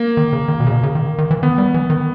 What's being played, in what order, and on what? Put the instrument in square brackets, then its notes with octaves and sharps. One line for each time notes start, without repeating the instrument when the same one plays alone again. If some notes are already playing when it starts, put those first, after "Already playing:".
Already playing: [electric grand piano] A#3
[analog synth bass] D#3
C#3
D#3
B2
C#3
B2
C#3
D#3
D#3
E3
[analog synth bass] D#3 [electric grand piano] B3
[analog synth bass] G3
E3
D#3